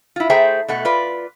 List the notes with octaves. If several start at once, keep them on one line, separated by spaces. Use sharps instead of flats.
E4 F4
A3 G#4 C5 E5 G5 A#5
B2 A3 F#5
F4 B4 D5